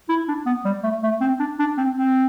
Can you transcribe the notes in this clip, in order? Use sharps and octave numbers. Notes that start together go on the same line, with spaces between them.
E4
D4
B3
G3
A3
A3
C4
D4
D4
C4
C4